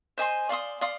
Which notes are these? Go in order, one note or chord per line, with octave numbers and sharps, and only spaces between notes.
C5 D#5 G#5 C6
D5 F5 C6 D#6
D5 F5 C6 D#6